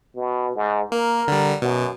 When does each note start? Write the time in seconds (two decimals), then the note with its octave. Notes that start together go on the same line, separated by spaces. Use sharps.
0.16 B2
0.56 G#2
0.92 A#3 A#4
1.28 D3 G3
1.62 F#2 B2